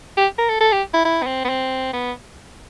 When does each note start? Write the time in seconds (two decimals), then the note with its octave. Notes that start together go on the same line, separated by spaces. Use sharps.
0.17 G4
0.38 A#4
0.49 A4
0.61 A4
0.72 G4
0.94 E4
1.05 E4
1.22 B3
1.27 C4
1.45 B3
1.49 C4
1.93 B3